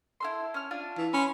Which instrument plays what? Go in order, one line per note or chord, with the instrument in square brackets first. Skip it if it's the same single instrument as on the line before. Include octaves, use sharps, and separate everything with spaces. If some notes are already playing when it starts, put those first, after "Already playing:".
[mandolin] E4 A4 C6
C#4 F6
D4 F4 F6
[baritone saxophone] E3
[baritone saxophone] C#4 [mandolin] B5 C6